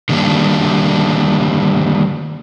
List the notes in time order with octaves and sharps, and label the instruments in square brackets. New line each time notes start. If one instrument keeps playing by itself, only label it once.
[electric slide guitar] D3 D#3 G3 A#3 D4